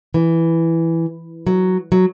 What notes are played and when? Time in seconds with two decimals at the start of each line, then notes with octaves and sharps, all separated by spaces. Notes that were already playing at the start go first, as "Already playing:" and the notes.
0.14 E3
1.47 F#3
1.92 F#3